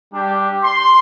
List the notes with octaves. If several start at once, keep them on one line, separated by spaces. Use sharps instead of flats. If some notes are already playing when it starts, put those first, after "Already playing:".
G3 D4 G4
C6